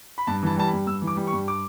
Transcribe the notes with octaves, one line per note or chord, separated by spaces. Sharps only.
B5
G2 A5
E3 A5
G3 A5
B5
G2
G2 E6
E3
D6
G3
C#6
G2
D6